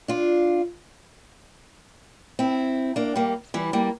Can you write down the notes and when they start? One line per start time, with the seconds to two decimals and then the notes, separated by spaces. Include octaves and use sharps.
0.08 D4 F4
2.39 C4 E4
2.96 A#3 D4
3.16 G3 A#3
3.54 E3 G3
3.73 G3 A#3